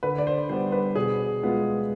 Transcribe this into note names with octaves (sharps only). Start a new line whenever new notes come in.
D3 B4
D5
C5
G3 B3 C5
B4
B2 G#4
G#3 B3 F4